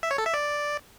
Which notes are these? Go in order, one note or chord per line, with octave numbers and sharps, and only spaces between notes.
E5
C#5
A4
E5
D5